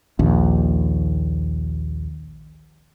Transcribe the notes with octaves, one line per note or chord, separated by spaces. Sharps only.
A#1 D#2